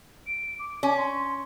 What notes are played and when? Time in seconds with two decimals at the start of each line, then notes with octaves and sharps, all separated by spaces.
0.27 D7
0.59 D6
0.83 C#4 D6
0.97 C6
1.16 C6